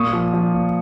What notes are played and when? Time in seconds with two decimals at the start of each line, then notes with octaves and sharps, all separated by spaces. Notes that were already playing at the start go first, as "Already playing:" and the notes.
Already playing: A#2 C#6 D#6
0.13 F3
0.33 F3
0.54 A#2